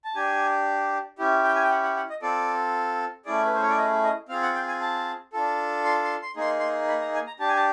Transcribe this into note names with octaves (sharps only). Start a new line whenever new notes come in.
A5
D4 G4 G#5
C#4 E4 G4
G5
G#5
G5
F#5
F#5
F#5
D#5
C4 F4 A4 D5
A3 C#4 E4 G#4 D5
B4
C5
C#5
D5
D#5
D#5
C4 F4 G#4 F5
F#5
G5
G#5
A5
D4 F4 A4
C6
C6
C6
A#3 D#4 G#4 C6
C6
B5
A#5
G#5
A#5
D4 G4 A5
G#5
A5